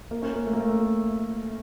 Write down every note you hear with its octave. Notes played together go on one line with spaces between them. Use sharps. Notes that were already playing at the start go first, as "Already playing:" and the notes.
A#3
C#4
A#3
A3
A#3
A3